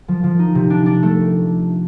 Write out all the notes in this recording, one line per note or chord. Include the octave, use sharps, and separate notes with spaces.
F3
F3
D#4
C3
D4
D4
A3